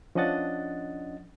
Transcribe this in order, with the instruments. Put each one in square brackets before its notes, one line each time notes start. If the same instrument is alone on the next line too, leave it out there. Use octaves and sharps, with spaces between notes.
[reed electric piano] F3 C#4 D4 D#5 F#5 A6